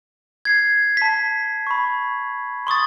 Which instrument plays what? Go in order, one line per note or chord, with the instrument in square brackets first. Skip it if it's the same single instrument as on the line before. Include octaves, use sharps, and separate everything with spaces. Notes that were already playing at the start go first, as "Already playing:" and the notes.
[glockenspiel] G#6 C7
A5 B6
B5 C#6
C6 C#6 D#6 A6